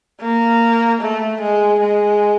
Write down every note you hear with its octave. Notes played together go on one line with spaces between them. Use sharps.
A#3
A3
G#3
G#3